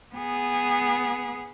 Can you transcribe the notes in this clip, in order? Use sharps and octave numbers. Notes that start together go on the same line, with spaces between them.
B3 G#4